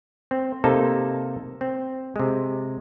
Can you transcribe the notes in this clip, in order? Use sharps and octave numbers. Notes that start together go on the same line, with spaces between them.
C4
C3 A#3 D#4 A4 A5
C4
C3 G#3